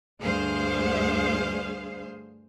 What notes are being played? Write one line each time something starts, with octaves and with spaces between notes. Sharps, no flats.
D2 G2 G#4 C5 F5